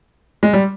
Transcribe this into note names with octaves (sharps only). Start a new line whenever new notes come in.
G#3
G3